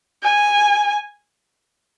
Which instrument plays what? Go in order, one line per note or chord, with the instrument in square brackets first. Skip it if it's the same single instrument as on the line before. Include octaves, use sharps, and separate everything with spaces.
[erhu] G#5